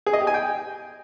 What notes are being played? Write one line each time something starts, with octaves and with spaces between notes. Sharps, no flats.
G#4
D#5
G4
G#5
G5